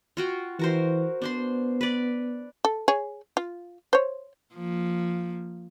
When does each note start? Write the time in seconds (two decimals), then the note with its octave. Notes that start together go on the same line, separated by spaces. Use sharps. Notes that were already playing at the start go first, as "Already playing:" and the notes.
0.17 F4 F#4 G5
0.59 E3 F#4 A#4 C5
1.22 B3 D4 C5 C6
1.81 B4 D5
2.65 A4
2.88 G#4 C#5
3.37 F4
3.93 C5 C#5
4.54 F3 A#3